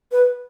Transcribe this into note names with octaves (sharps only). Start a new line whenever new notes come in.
B4